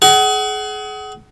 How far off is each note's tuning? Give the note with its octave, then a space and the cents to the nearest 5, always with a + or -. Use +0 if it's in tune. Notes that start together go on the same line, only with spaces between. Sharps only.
G#4 +30 F#5 +35